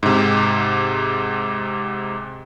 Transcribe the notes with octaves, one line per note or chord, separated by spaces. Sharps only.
G#2 C3